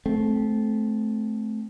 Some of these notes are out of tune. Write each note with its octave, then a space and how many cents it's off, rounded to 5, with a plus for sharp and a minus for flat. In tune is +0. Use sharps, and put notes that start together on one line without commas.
A3 -20 C4 +0